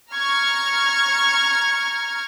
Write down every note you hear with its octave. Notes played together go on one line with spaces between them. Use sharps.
A#5 C#6 F6 G#6